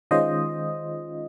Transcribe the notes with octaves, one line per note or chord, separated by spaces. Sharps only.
D#3 G#3 C#4 F4 C5 D#5